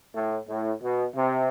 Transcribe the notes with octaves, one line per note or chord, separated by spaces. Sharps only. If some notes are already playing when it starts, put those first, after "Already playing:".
A2
A2
B2
C3